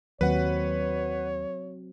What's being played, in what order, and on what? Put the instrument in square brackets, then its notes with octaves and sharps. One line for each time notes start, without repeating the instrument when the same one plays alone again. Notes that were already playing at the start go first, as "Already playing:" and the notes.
[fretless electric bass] D#2 [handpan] F#3 C4 [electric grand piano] B4 F#5 [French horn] C#5